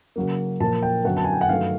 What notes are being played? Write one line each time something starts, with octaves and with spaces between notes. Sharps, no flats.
C#3 F#3 A#3
A#2 F3 A#3 A5
G5
F#2 D3 F#3 B3 F#5
A5
G#5
G5
F#5
G2 D#3 F#3 A3 F5